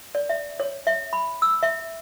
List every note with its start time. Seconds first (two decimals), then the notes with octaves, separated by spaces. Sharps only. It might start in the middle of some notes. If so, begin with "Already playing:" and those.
0.15 D5
0.29 E5
0.60 C#5
0.87 E5
1.13 B5
1.42 E6
1.63 E5